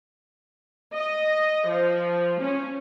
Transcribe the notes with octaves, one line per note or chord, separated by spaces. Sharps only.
D#5
F3
C#4